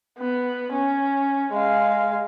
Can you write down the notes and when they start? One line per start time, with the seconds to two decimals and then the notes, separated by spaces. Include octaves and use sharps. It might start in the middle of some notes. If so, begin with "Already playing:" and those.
0.18 B3
0.72 C#4
1.52 G#3 F5